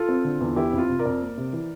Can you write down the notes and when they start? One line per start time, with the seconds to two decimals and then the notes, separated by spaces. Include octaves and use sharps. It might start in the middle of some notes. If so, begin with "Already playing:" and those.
Already playing: F4 A4
0.09 C4
0.24 D3
0.41 E2
0.56 E3 E4 G4
0.73 F2
0.78 F4
0.89 C3
0.99 A#4 D5
1.06 F2
1.21 A#3
1.37 C3
1.53 E3